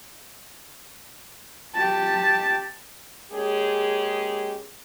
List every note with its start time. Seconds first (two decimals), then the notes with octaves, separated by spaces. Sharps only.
1.75 G4 A5
3.32 G#3 A#3 C#4 G4 G#4